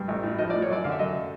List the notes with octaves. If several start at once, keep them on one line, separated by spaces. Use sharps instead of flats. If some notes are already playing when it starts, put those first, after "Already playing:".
Already playing: G2
A1
A2
F3 D#5
A2 D5
C#5
F#2 D5
D3 F5
E5
F#2 D#5